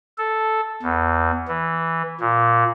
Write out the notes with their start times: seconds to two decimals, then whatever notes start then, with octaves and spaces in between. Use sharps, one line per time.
0.18 A4
0.82 E2
1.48 E3
2.20 A#2